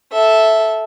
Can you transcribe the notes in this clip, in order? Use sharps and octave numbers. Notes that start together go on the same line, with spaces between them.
A4 E5